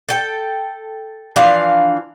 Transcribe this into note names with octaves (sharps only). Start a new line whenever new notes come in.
A4 G5
E3 F3 D4 F5